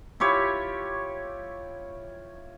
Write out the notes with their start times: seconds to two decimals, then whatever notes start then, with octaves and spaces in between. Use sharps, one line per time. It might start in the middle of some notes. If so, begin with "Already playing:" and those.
0.20 E4 F4 G4 C#5